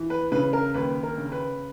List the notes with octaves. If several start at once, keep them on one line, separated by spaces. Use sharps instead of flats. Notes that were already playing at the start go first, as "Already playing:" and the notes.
Already playing: E3
B4
C#3 B4
A#4
D#2 B4
A#4
C#3
B4